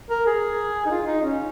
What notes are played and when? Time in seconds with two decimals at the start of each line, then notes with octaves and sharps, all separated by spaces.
0.10 A#4
0.26 G#4
0.86 D#4
0.90 F4
1.07 D#4
1.23 C#4